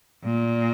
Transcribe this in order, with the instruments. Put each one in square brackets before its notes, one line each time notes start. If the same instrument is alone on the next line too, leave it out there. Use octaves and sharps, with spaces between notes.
[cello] A#2